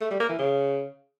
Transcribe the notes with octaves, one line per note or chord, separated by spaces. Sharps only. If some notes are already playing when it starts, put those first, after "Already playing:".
A3
G3
A#3
E3
C#3